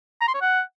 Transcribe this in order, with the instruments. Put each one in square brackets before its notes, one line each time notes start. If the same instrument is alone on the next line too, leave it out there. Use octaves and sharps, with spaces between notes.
[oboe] A#5
C6
C#5
F#5